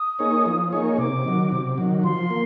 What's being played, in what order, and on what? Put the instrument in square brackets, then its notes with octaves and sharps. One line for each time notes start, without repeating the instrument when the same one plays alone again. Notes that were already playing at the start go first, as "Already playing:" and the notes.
Already playing: [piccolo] D#6
[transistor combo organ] A#3 D#4 G#4 C#5
F3
A#3 D#4 G#4 C#5
[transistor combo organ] C3 [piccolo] D6
[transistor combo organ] D#3 F#3
C3
D#3 F#3
[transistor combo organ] F3 [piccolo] C6
[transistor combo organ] A#3